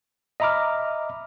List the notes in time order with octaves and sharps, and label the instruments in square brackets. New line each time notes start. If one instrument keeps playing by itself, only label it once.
[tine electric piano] D#5 E5 A#5 B5 D6 F6